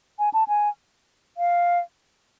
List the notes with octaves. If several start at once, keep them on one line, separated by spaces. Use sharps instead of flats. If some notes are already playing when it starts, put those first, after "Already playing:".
G#5
A5
G#5
F5